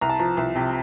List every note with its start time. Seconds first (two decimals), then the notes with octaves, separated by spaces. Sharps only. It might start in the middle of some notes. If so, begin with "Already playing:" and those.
0.01 C2 A#5
0.09 A5
0.19 F3 A#5
0.37 C2
0.56 C3